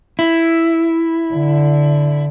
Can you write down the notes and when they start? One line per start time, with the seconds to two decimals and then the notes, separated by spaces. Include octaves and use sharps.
0.19 E4
1.34 D3